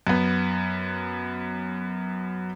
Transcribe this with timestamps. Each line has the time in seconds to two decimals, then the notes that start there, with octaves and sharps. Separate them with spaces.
0.07 F#2 B3